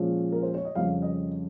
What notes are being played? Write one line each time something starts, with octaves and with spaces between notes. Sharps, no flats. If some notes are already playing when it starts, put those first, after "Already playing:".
Already playing: A#2 F3 G#3 C#4
A#4
C5
C#5
D#5
F2 C#3 G3 C#4 F5
D#5